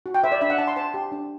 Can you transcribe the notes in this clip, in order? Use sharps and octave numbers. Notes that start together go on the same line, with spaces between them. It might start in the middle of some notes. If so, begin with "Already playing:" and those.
F#4
G5
C5 E5
D5
D4 E5
F#5
D4 A5
C6
C5 A5
G4
D4